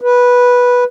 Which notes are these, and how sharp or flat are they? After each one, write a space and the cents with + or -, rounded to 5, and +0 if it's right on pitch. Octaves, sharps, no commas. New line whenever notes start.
B4 -10